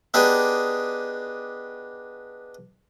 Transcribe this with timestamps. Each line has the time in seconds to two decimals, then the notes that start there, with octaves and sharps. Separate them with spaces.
0.14 B3 D4 D#4 G4 G#4